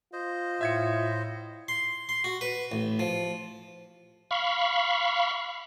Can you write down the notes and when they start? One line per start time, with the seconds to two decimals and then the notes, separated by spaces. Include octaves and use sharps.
0.13 F4 C5 D#5
0.61 A2 E5 G#6 C#7
1.68 C6
2.09 C6
2.24 F#4
2.41 B4
2.72 A1
2.99 F3
4.31 F5 B5 C#6